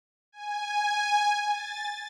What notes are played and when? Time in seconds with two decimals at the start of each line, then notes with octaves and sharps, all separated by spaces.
0.32 G#5
1.50 A6